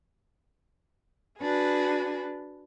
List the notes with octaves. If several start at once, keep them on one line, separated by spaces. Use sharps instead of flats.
D4 F#4 G#4 B4